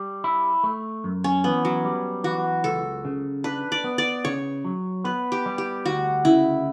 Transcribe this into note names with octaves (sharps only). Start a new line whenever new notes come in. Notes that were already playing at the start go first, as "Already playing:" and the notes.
Already playing: G3
E4
A3
F#2
C#4
E3 B3
F#3
G3
E3 F#4
C#2 A4
C#3
D4 B4
D5
B3
D5
C#3 C#5
F#3
B3 B4
G4
G3
G4
D2 F#4
C#3 E4